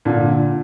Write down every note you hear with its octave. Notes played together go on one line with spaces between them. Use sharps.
A#2 D3